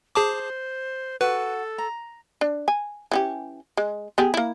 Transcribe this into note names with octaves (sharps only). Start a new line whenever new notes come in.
G#4 C5 A5 D6
F#4 A4 B4
A#5
D4
G#5
E3 C#4 G4
G#3
B3 G4 G#4
A#3 E4